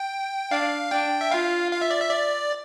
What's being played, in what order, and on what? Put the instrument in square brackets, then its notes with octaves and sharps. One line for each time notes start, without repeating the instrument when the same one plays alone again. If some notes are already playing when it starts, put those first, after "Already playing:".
Already playing: [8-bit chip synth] G5
[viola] D4 [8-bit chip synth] F5
[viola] D4 [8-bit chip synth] G5
[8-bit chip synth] E5
[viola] F4 [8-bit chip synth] F5
[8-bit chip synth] F5
E5
D5
E5
D5